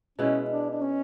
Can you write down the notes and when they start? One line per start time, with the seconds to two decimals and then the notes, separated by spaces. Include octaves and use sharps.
0.18 B2 G#3 B3 C#4 E4
0.50 D4
0.70 D4
0.81 C#4